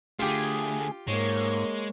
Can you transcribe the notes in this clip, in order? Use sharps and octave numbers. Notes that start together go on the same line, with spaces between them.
D3 A3 F4 G4 G#4
G#2 G#3 A#3 C#5